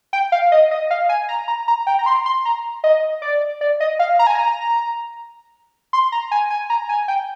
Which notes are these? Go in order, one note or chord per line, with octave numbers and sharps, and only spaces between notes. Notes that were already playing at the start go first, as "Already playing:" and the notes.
G5
F5
D#5
D#5
F5
G#5
A#5
A#5
A#5
G5
A#5
C6
C6
A#5
D#5
D5
D5
D#5
F5
A#5
G#5
A#5
C6
A#5
G#5
G#5
A#5
G#5
G5